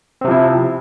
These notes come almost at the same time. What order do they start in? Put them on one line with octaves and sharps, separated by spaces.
C4 C3 F3 E4